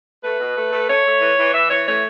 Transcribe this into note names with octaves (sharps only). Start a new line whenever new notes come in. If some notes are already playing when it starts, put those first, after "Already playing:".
A3 B4
B2
A3
A3
A3 C#5
A3
E3
E3
E3 E5
E3 C#5
A3 C#5